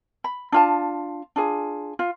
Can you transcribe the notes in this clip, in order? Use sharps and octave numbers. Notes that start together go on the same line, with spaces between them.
B5
D4 F4 A5
D4 F4 G#4
F4